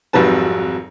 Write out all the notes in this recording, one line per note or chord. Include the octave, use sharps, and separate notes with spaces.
G#1 F2 F#3 G3 B4 A5